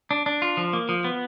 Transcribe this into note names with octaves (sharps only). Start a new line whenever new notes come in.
D4
D4
F4
F3
A#3
F3
B3